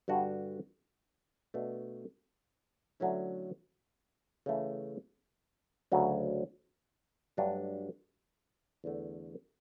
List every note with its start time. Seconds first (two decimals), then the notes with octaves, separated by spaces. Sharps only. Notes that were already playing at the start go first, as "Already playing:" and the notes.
0.08 G2 D3 G3 D4 F#4
1.54 B2 A3 D4
3.00 D3 F#3 A3 C#4 E4
4.46 C#3 E3 A3
5.92 D2 C#3 F#3
7.37 G2 F#3 A3 D4 F#4
8.84 E2 D3 A3